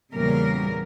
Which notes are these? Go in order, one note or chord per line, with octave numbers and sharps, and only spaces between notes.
E2 A#2 C#3 G3 A#3 A#4